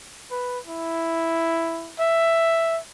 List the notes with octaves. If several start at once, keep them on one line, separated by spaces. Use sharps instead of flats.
B4
E4
E5